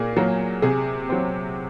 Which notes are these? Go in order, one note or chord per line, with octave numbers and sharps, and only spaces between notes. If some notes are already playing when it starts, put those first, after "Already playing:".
Already playing: A#2 A#3 G#4
F#3 A#3
C3 G#4
F#3 C4